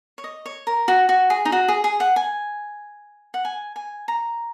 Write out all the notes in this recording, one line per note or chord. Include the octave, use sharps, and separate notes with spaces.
C#5
D#5
C#5
A#4
F#4
F#4
G#4
D#4
F#4
G#4
G#4
F#5
G#5
F#5
G#5
G#5
A#5